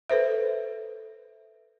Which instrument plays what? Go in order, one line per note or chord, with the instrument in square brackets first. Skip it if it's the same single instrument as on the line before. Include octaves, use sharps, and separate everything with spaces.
[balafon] A4 B4 C5 E5